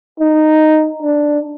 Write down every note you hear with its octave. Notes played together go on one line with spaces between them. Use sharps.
D#4
D4